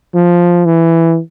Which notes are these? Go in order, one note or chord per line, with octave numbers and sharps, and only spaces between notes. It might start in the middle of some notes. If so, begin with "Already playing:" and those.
F3
E3